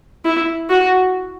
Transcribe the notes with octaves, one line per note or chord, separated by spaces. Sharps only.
E4
F#4